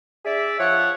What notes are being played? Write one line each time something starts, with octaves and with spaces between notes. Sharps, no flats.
D4 G#4 D5 E5
F3 C#5 F#5